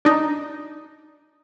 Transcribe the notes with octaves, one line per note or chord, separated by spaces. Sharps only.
D4 D#4